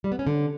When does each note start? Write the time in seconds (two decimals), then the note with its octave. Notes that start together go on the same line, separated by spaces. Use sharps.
0.04 G3
0.12 B3
0.19 C#4
0.27 D3